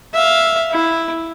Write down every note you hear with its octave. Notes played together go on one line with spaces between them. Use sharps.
E5 F5
E4